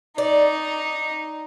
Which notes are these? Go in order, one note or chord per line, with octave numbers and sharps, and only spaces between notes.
D#4 D5